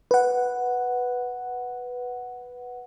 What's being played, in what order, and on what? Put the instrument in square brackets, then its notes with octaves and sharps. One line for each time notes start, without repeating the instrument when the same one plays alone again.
[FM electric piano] B4 F#5